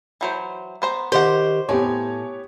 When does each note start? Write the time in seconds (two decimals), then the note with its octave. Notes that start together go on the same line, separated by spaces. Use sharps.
0.21 E3 F#3 C5
0.82 B3 C5 A#5
1.12 D#3 G4 C5 D5 F#5
1.69 A2 B3 G4 C#5 G#5